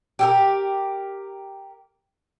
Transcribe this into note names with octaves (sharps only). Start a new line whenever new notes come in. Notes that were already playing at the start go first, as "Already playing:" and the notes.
G4 A4 A#4